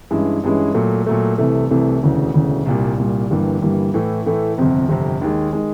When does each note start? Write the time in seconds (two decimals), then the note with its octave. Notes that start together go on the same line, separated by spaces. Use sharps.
0.11 G2 E3 G#3 C#4 E4
0.43 G2 E3 G#3 C#4 E4
0.74 A#2 F#3 A3
1.06 A#2 F#3 A3
1.38 C2 C3 E3 A3
1.70 C2 C3 E3 A3
2.02 E1 D2 C#3 E3
2.34 E1 D2 C#3 E3
2.66 C2 A#2 G3
2.98 C2 A#2 G3
3.30 G1 G2 E3 G3 A#3
3.62 G1 G2 E3 G3 A#3
3.94 A2 E3 A3
4.26 A2 E3 A3
4.58 G1 F2 C3
4.89 G1 F2 C3
5.21 D#2 D#3 G#3
5.53 D#3 G#3